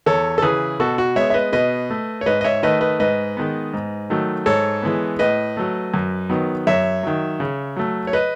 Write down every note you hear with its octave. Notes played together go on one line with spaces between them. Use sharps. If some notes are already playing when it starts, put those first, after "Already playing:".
E2 A4 C#5
A4
C#3 E3 G#4 B4
B2 F#4 A4
F#4
G#3 B3 C#5 E5
E5
B4 D#5
B2 B4 D#5
A3
C#5
G#2 B4 D#5
D#5
C#5 E5
D#3 A3 B4 D#5
B4 D#5
G#2 B4 D#5
D#3 G#3 B3
G#2
D#3 F#3 A3
G#2 A4 C#5
E3 G#3 B3
A2 B4 D#5
F#3 A3
F#2
D#3 F#3 B3
F#2 C#5 E5
D#3 F#3
C#3
F#3 A3
C#5
B4 D#5